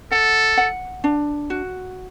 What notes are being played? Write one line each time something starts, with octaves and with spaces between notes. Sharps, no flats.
A4 F#5
F#5
D4
F#4